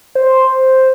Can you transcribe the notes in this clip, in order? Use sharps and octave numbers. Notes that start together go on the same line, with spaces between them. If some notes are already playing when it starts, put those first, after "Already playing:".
C5